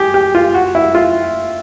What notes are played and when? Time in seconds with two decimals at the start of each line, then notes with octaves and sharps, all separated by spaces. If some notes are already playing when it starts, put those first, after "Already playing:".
Already playing: G4 G#4
0.14 G4
0.35 F4
0.54 F#4
0.75 E4
0.95 F4